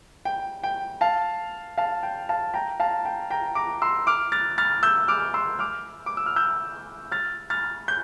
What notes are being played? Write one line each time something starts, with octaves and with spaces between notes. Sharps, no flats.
G5
G5
F5 A5
F5 A5
G5
F5 A5
G5 A#5
F5 A5
G5
G5 A#5
A#5 D6
C6 E6
D6 F6
F6 A6
F6 A6
E6 G6
D6 F6
C6 E6
D6 F6
D6
E6
F6
E6 G6
F6 A6
F6 A6
G6